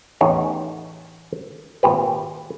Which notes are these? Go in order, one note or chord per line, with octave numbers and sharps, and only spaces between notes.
A1 E2 D#4 G4 C#5
G#1 A#2 G4 B4